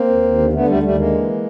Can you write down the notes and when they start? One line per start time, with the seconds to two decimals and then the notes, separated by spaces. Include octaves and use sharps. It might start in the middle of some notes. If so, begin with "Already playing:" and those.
Already playing: A#3 C4
0.09 D#2
0.23 D#2
0.38 D3
0.53 D3 A3 B3
0.68 D#2 G3 A3
0.83 D#2 G3 A3
0.98 D3 G#3 A#3
1.13 E3